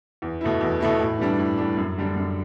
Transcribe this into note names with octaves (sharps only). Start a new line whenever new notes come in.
E2
B2 A3 E4
E2
B2 A3 E4
A2
E3 G3 D4
A2
E3 G3 D4
F#2
D3 G3 D4
F#2